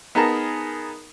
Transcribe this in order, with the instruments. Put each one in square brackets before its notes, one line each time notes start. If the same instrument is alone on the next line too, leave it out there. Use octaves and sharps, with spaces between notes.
[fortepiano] B3 D#4 G#4 A#4 A5 A#5